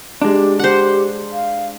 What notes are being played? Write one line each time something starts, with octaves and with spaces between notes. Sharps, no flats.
G#3 D4 G4
G4 C5 F#5
F5